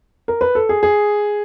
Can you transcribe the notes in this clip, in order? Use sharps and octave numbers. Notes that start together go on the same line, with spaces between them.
A#4
B4
A4
G#4
G#4